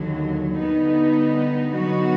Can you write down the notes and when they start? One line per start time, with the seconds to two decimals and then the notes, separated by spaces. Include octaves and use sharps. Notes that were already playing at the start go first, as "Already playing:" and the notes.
Already playing: D#2 D3 F#3
0.57 D3 G3 B3 D#4
1.73 D3 F#3 B3 D#4 F#4